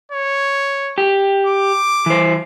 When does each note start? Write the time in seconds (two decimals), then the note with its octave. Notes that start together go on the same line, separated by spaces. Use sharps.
0.12 C#5
0.98 G4
1.47 D6
2.06 E3 C5